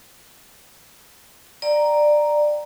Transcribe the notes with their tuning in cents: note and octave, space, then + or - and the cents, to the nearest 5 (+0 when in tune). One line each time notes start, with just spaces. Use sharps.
D5 +15 G5 -25 A#5 +0